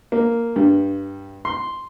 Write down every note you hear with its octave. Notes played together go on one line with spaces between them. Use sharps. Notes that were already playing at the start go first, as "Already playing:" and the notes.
A#3
G2
C6